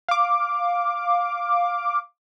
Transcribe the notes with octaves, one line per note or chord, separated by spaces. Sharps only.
F5 D6